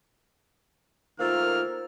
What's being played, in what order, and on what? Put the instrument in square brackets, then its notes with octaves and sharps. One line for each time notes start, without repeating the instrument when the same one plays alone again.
[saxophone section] D#3 A3 A#3 [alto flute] F4 [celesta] C5 E6 A6 [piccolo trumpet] F6